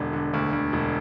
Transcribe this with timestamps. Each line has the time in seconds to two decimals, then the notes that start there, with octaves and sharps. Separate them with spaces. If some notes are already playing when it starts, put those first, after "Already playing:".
Already playing: E1 D3
0.13 D3
0.34 D2
0.53 D2
0.73 E1